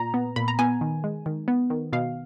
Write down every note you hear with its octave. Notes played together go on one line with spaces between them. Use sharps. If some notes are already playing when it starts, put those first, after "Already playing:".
Already playing: A#2 A#5
B3
A#2 B5
A#5
B3 G#5
D#3
G#3
D#3
B3
D#3
B2 F5